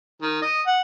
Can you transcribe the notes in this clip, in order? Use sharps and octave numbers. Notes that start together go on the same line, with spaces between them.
D#3
D#5
F#5